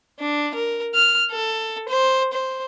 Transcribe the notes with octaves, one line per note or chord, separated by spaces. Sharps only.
D4
A#4
F6
A4
C5
C5